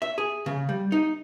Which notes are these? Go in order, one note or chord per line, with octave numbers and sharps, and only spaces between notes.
E5
G#4
C#3
G3
D#4